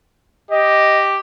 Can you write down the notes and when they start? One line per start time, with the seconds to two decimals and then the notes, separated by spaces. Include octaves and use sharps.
0.51 G4 D#5